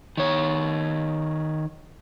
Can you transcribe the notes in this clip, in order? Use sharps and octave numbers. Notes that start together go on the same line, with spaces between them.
D#3 C#5